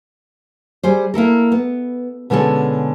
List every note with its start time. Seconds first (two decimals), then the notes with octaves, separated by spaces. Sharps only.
0.83 G3 G#4 C5
1.14 A#3 E4 A4 A#4
1.52 B3
2.30 B2 D3 G#3 C#4 A4